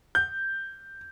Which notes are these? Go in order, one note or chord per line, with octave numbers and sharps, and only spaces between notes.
G6